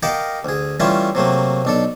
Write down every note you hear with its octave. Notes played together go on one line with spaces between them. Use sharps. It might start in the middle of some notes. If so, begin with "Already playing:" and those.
G4 A#4 D#5 F5 F#5 A5
D2 G#4
E3 G3 A3 C#4 F4 E5
C3 F#3 A3 A#3
B1 D4 A4